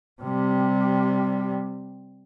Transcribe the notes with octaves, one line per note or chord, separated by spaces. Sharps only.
C3 G3